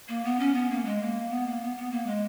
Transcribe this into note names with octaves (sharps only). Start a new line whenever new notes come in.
A#3
B3
C#4
B3
A#3
G#3
A#3
B3
A#3
B3
B3
A#3
G#3